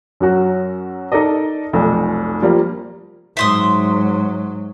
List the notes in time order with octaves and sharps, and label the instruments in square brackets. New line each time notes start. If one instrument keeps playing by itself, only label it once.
[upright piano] F#2 F#3 F#4
D#4 A4 A#4 D5 D#5
F1 B1 F2
F3 G3 A#3
[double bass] G#2 F#3 [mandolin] E5 C6 D#6